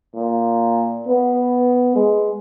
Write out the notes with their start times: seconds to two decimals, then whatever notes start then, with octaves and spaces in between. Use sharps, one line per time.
0.15 A#2
1.08 B3
1.96 G#3